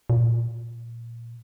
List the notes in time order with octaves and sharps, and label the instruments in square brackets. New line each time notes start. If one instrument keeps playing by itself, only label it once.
[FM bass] A#2